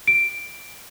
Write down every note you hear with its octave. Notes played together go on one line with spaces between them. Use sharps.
D7